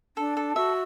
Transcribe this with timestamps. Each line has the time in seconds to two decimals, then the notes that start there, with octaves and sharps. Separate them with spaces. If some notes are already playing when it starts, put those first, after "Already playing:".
0.17 D4 A4
0.37 A4
0.56 F#4 E5